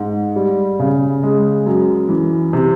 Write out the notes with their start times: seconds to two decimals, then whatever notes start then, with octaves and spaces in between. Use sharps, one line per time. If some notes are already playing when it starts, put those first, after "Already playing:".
Already playing: G#2
0.36 G3
0.80 C#3
1.23 G#3
1.66 F#2
2.09 E3
2.53 C3